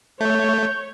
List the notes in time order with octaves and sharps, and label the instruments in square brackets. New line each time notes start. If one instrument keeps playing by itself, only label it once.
[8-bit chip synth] A3 [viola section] C#5 [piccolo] G6